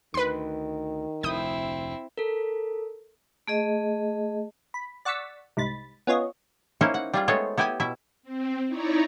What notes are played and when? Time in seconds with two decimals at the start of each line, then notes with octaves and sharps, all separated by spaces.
0.14 D2 D#3 B4 C6
1.23 F1 D2 C4 E4 D#6 G6
2.17 A4 A#4
3.48 A3 G#4 D#5
4.74 B5
5.05 D5 F#5 C#6 E6 A6 B6
5.57 C2 G#2 B5 A6
6.07 B3 C#4 F4 C#5 D#5
6.81 A#3 C#4 D#4 E4 C5 C#5
6.94 F#5
7.14 G3 F4 G#4
7.28 G#3 A3 B3 A4 C5 C#5
7.58 B3 E4 G4 G5 G#5
7.80 B2 E4 E5
8.23 C4
8.67 D#4 E4 C#5 D5 A#5